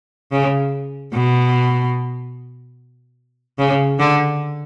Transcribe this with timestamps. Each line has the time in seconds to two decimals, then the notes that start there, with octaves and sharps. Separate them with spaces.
0.32 C#3
1.13 B2
3.58 C#3
3.99 D3